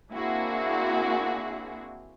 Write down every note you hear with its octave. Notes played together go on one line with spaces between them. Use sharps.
A#3 C4 D4 E4 F#4 G#4